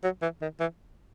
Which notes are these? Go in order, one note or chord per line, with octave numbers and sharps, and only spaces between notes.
F#3
E3
D#3
E3